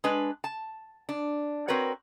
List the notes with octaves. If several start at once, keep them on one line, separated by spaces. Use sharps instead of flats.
G#3 D4 B4
A5
D4
C4 F#4 A#4 B4 C#5